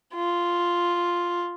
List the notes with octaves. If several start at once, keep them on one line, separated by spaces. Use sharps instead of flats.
F4